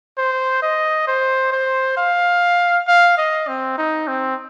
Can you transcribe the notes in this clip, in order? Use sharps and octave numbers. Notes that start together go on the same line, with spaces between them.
C5
D#5
C5
C5
F5
F5
D#5
C4
D#4
C4